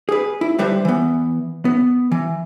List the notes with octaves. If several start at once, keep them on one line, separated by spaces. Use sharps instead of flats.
G#4 B4
E4
D3 G3 B4 C5 E5
E3 B3
B3
E3